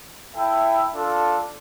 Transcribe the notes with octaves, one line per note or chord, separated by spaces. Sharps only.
E4 A4 E5 G5
D4 F4 A4